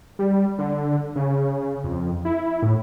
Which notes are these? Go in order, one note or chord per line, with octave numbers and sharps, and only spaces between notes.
G3
D3
C#3
F2
E4
A2